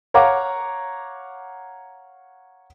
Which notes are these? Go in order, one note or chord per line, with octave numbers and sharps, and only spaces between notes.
C#5 F5 F#5 A#5 D6